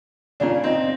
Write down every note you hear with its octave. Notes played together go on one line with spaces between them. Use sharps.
A#2 C#3 D4
C4 D#5